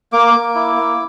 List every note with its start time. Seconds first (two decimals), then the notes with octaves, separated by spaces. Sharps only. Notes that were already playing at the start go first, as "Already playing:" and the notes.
0.13 A#3 D6
0.34 A#3
0.55 E4
0.76 A#3